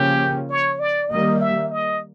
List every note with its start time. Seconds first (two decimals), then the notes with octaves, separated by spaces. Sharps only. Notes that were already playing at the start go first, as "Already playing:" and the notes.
Already playing: C#3 F3 A#3 C#4 G4
0.50 C#5
0.80 D5
1.10 D#3 G3 A#3 D#5
1.41 E5
1.71 D#5